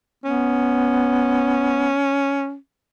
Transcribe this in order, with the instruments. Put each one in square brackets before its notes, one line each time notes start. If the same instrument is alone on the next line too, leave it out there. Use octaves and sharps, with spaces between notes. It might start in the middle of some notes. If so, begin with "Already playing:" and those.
[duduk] B3 [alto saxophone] C#4